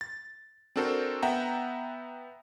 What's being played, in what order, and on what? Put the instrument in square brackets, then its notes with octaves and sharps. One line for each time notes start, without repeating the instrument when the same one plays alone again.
[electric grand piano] A6
C4 D4 F#4 A4 A#4 C5
B3 E5 F#5 G5 A#5